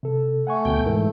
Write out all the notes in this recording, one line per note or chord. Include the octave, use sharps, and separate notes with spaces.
C3 A4
A3 F#5 G#5 C#6
D2 B2 G5
G#2 E3 A#4